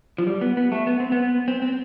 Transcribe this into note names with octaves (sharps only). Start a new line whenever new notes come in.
F3
G3
B3
B3
A3
B3
C4
B3
C4
C4